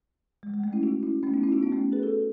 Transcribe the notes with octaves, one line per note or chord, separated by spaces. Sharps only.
G#3
G#3
A3
C#4 E4
D#4 F#4
C#4 E4
A3 C#4
B3 D#4
C#4 E4
D#4 F#4
B3 D#4
A3 C#4
G#4 B4
F#4 A4